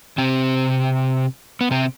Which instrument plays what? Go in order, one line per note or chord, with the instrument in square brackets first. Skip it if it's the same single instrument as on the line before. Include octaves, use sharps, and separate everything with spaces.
[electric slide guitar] C3 C4
B3
C3 C4